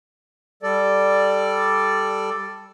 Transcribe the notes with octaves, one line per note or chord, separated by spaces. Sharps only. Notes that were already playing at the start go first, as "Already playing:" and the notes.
G3 A4 D5